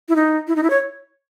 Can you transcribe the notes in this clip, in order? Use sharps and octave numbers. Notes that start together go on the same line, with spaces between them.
E4
D#4
E4
D#4
E4
C#5